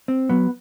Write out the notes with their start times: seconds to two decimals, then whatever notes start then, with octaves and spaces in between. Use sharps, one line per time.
0.08 C4
0.29 F#3 B3